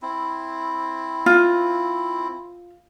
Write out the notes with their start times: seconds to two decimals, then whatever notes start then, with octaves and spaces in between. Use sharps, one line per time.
0.02 C4 E4
1.26 F4